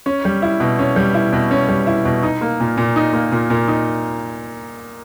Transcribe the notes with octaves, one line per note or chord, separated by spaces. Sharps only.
C#4
G3
E4
B2
C#4
G3
E4
B2
C#4
G3
E4
B2
D#4
A#3
A#2
A#2
D#4
A#3
A#2
A#2
D#4